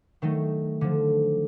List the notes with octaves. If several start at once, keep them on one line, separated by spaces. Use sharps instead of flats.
D#3 F#3 A3 D#4
D3 F3